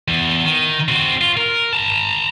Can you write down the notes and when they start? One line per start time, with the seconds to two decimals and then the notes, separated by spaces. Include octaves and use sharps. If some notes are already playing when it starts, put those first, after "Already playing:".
0.08 E2
0.45 D#3
0.88 C4 F#4
1.21 F4
1.37 A#4
1.73 A5 A#5